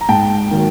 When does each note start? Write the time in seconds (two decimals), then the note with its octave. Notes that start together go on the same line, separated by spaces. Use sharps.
0.01 A#5
0.09 G#2 G5 A5
0.51 D#3 F#3 A#3